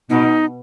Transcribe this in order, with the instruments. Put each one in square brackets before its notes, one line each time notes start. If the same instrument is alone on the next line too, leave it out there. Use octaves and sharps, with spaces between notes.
[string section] B2 [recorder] D#4